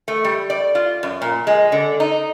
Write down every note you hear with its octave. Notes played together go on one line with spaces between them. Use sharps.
A3
G3
D5
F4
F#2
A#2
G#3
D3
D#4